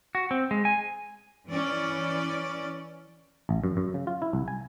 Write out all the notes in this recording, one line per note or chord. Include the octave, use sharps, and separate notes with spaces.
F#4
C4
G#3
G#5
E3 C#4 D5
A1
F#2
F#2
C#3
F4
E4
C2
G#5